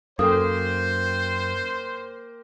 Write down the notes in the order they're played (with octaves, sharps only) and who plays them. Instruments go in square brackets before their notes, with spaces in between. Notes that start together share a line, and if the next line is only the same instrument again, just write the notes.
[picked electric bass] F#2 [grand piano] A#3 G5 [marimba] A4 D#6 [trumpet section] C5